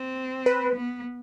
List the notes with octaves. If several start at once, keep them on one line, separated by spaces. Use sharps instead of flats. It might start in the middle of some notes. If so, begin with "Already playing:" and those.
Already playing: C4
B4
B3